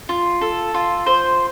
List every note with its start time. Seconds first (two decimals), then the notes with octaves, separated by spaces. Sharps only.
0.09 F4
0.41 A4
0.74 F4
1.06 C5